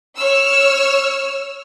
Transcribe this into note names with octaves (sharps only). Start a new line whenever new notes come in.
C#5 E6 F6